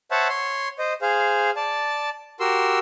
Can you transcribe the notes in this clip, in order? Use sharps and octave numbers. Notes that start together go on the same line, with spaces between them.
C5 C#5 E5 F#5 A5
C#5 C6
C5 D#5
G#4 C5 F5
D5 A5
F#4 G4 A#4 C6 E6